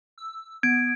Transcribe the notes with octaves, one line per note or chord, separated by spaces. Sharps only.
E6
B3 G#6 D7